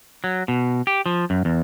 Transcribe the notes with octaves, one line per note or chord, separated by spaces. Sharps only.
F#3
B2
G4
F3
F#2
E2